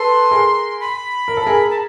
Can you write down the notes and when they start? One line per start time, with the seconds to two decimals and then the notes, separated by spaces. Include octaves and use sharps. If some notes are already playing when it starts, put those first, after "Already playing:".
Already playing: A4 B4 C6
0.31 G#4 A#4
0.80 B5
1.28 A#4
1.37 A4
1.46 G#4 A#4
1.70 A5